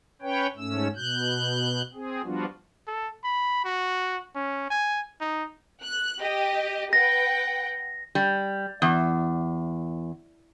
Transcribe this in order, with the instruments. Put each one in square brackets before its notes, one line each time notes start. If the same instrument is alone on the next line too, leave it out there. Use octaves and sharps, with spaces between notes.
[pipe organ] C#4 B4 C#5 G5
G#2 A3 C#4 E6
B2 F#6 G6
C4 G#4
F3 G3 B3 D4 F4 F#4
[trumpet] A4
B5
F#4
C#4
G#5
D#4
[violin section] F#6
G4 D#5
[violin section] B4 F#5 G5 [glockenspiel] A#6
[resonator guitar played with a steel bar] G3
E2